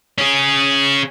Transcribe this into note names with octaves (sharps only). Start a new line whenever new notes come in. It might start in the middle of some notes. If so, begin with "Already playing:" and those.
C#4 G#4